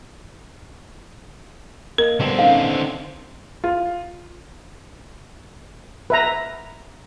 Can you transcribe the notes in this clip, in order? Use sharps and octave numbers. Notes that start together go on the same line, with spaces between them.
A#3 A#4 D#5
D3 G3 B3 C4
B3 C#4 D#4 F5
F4
B4 E5 A#5